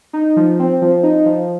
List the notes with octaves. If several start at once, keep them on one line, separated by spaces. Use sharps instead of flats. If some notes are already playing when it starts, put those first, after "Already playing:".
D#4
F3
C4
F3
D#4
F3